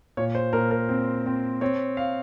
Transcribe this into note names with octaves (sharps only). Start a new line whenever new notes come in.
A#2 C#5
C5
A#2 A#4
A#4
C4
C4
C4 C#5
F5